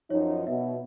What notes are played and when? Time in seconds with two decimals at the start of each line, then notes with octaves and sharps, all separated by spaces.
0.10 F#2 F3 D#4 C#5
0.47 B2 E5